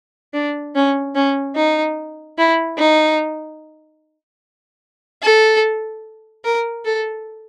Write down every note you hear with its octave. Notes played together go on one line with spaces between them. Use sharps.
D4
C#4
C#4
D#4
E4
D#4
A4
A#4
A4